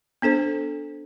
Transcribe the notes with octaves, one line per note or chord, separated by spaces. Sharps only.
B3 D4 A4 C5